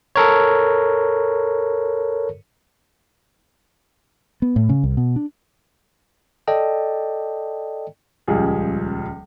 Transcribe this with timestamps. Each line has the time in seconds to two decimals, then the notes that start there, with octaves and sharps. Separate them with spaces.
0.16 A4 A#4 C#5
4.42 B3
4.56 A2
4.69 C#3
4.84 C2
4.97 B2
5.16 D4
6.48 A4 D5 D#5 G5 A5
8.28 D#1 C#2 F3 G3 G#4